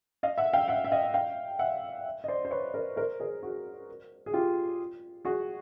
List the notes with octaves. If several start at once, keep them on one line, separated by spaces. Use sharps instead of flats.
D#5 F5
E5 F#5
F5 G5
E5 F#5
E5
D#5 F5
F5 G5
E5 F#5
D#5
C5 D5
C5
B4 C#5
A#4 C5
A#4 C5
G#4 A#4
F#4 G#4
G#4
F4 G4
F#4 G#4